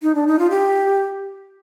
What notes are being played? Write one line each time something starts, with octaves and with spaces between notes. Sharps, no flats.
D#4
D4
D#4
F4
G4